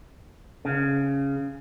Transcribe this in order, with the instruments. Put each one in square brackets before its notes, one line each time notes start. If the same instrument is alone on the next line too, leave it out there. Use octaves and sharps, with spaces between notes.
[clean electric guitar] C#3